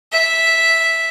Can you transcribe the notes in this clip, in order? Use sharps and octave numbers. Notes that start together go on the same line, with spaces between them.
E5